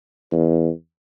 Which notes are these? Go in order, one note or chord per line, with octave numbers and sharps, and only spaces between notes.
E2